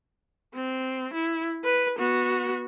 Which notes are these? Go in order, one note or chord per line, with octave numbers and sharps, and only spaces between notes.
C4
E4
B4
B3 F#4